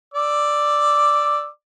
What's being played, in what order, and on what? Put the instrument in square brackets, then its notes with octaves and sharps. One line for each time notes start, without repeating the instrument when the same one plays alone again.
[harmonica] D5 D6 E6